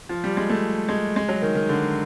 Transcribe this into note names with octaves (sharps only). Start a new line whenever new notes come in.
F3
G3
G#3
A3
G#3
G#3
F#3
D#3
D#3
D3